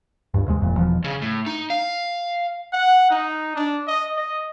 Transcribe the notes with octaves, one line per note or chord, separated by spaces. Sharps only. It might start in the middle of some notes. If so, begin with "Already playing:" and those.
C#2 G2
D#2 C3 G#3
F#1 F2 A#2
E1 B2 F3
C#3
A2
D#4
F5
F#5
D#4
D4
D#5
D#5